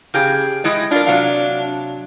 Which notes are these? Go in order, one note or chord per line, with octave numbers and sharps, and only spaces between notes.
C#3 G4 G#4
G#3 E4 D#5
D4 F4 A#4
C3 F#3 F5